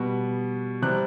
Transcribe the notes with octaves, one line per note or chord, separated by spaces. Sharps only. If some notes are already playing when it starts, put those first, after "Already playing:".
Already playing: B2 G3 B3
C3 G3 C4 F#6